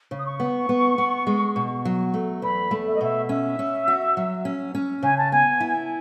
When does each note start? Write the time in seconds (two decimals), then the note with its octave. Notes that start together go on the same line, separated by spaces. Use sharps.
0.11 C#3
0.18 D#6
0.25 C#6
0.40 B3
0.69 B3
0.98 B3
1.27 G#3
1.56 B2
1.85 F#3
2.14 A3
2.42 E2 B5
2.71 A3
2.86 E5
2.94 D#5
3.01 B2 E5
3.29 C#4 E5
3.59 C#4
3.88 F#4
4.17 F#3
4.45 C#4
4.75 C#4
5.03 C#3 G#5
5.17 A5
5.31 B3 G#5
5.60 E4